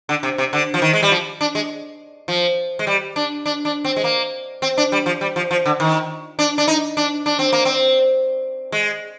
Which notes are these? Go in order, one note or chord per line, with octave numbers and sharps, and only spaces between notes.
D3
C3
C3
D3
F3
D#3
G#3
G3
F3
D4
G#3
F3
G#3
G3
D4
D4
D4
C4
G#3
A#3
C4
D4
G3
F3
G3
F3
F3
D3
D#3
D4
D4
D#4
D4
D4
C4
A#3
C4
G#3